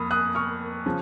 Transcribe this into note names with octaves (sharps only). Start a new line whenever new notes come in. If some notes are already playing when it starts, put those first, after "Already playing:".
Already playing: F2 A#3 B5 D#6
D#6 F#6
C#6 F6
C#3 F3